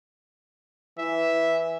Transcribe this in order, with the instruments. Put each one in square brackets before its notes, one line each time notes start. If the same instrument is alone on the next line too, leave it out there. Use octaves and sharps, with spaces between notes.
[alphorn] E3 [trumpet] E5